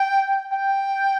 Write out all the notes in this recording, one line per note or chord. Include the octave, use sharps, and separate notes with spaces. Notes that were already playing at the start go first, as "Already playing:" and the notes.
Already playing: G5
G5